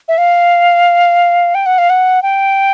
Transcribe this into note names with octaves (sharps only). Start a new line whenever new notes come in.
E5
F5
G5
F#5
F5
F#5
G5